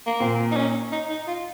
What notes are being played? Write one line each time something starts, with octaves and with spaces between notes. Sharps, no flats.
A#3
A#2 C4
D#4
C#4
D#4
D#4
F4